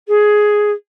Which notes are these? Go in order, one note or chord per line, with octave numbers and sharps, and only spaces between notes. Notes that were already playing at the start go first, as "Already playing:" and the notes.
G#4